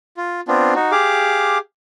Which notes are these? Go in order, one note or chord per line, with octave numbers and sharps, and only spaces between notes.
F4
B3 C4 D4 F4
D#4 F#4
G4 G#4 F5 D6